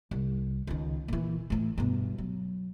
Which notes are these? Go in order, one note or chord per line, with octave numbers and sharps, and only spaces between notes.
C2
C#2 D#3
A#2 E3
A2 E3
G2 B2
F#3